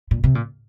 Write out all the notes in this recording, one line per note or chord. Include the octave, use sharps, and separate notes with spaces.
A#2
C3
A#2